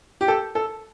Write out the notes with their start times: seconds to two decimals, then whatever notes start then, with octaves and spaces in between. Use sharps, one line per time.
0.21 G4
0.28 A4
0.55 A4